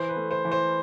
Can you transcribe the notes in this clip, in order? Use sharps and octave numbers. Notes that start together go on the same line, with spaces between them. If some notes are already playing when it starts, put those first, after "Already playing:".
Already playing: E3 C5
B4
A3
C5
E3
C5